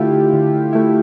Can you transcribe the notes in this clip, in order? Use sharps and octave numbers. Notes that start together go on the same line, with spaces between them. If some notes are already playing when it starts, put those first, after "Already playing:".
Already playing: D3 A3 E4 F4 G4
D3
A3 E4